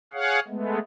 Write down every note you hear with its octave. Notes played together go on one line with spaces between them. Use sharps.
G#4 C#5 F5 F#5
G#3 A3 B3